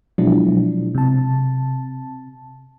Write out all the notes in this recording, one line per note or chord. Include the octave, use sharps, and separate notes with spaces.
B2 F3 F#3 G#3 D4 E4
C3 A5